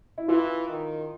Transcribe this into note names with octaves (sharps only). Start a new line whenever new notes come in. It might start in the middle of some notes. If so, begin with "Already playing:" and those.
E4
E3 F4
D#3